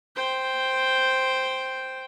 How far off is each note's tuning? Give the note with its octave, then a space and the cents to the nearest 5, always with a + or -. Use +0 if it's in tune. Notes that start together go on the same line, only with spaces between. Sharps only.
C5 +0 G5 +0